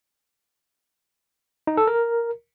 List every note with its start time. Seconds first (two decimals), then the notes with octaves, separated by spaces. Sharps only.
1.67 D#4
1.77 A4
1.87 A#4